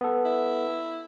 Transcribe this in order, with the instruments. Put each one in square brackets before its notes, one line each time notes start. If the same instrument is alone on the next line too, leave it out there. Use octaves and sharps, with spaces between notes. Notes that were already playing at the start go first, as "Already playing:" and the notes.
[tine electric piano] B3 A4
[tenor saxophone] E4